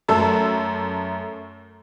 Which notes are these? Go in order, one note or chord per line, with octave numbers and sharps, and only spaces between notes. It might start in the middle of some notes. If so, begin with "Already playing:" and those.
F#2 A3 A5 E6